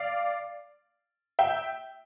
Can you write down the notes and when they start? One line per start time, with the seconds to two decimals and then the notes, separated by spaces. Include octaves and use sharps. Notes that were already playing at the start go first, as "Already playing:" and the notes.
Already playing: D5 F5
1.39 E5 G5